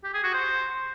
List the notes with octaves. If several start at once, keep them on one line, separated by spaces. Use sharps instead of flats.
G4
G#4
F#4
C5